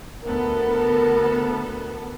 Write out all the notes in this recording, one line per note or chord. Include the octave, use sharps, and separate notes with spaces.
D2 B3 A4 A#4